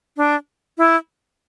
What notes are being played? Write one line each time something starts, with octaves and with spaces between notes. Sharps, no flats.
D4
E4